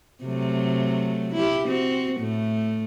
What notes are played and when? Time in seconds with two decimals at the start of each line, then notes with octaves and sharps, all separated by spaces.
0.24 C3 F#3 A3
1.33 E4 G4
1.67 C4 F#4
2.17 A2 A3